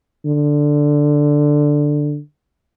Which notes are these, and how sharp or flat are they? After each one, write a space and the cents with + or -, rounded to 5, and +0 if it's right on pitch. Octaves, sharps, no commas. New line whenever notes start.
D3 +5